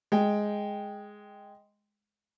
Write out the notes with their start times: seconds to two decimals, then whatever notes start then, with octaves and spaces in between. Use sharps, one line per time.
0.12 G#3 G5